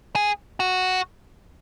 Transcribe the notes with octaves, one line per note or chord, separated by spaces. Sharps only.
G#4
F#4